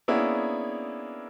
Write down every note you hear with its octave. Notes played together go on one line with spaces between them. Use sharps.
A#3 B3 C#4 D4 E4 G#4